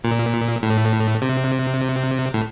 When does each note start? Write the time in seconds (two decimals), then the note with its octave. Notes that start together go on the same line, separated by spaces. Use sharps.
0.04 A#2
0.63 A2
1.22 C3
2.34 A2